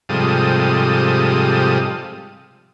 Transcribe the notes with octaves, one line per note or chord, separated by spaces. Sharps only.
G#2 C3 F3 G3 A4 D#6